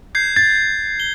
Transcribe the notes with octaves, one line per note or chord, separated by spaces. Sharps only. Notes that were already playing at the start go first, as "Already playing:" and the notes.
G6 G#6 C7
G#6 A6
G7